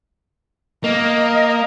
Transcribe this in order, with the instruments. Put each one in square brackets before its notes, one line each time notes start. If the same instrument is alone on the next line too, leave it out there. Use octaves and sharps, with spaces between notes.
[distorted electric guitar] A#3 [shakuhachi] D#5